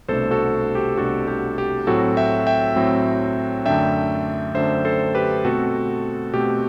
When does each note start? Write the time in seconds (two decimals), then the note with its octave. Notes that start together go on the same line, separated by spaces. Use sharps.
0.08 C2 B2 A3 D4 A4 C5
0.31 F#4 A4
0.75 G4
0.97 C2 B2 A3 D4 F#4 A4
1.28 G4
1.58 G4
1.87 A2 F#3 C4 F#4 A4
2.17 E5 G5
2.47 E5 G5
2.76 A2 F#3 C4
3.66 F#2 D3 A3 D4 E5 G5
4.55 F#2 D3 A3 D4 C5 E5
4.85 A4 C5
5.15 G4 B4
5.45 B2 A3 C4 F#4 A4
6.33 B2 A3 C4 G4